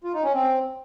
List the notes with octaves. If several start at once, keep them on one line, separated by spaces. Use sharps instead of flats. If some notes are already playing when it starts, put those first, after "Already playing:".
F4
D#4
C#4
C4